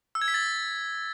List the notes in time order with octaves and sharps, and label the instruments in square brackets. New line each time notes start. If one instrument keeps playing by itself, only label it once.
[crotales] E6
G#6
B6
A6